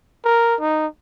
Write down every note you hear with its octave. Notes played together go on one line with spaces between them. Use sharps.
A#4
D#4